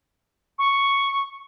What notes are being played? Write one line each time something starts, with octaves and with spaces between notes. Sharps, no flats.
C#6